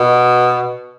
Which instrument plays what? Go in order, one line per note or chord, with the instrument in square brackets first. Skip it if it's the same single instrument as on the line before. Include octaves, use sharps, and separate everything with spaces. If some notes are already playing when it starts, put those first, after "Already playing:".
Already playing: [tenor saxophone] B2